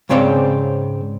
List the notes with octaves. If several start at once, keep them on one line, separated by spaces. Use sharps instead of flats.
G#2 C#3 C4 C#5 D5